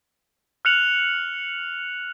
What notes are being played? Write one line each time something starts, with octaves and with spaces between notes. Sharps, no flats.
F6 F#6 C#7 F7 F#7